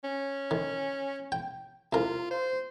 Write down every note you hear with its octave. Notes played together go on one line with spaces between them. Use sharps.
C#4
D#3
G5
C2 F4 A#4
C5